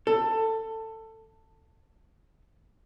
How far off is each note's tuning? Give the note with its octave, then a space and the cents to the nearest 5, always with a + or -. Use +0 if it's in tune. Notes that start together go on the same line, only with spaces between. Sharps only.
A4 +15